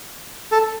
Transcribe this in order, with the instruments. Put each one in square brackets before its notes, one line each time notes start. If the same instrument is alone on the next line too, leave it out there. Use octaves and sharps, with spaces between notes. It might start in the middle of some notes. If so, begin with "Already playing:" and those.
[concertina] A4